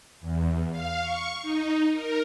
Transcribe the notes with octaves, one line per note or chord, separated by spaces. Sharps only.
E2
F5
C#6
D#4
A#4